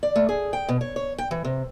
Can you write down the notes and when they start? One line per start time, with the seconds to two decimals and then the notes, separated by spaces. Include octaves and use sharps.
0.03 D5
0.16 A3
0.29 G#4
0.53 G5
0.69 B2
0.81 C#5
0.96 C#5
1.18 G5
1.31 E3
1.45 C3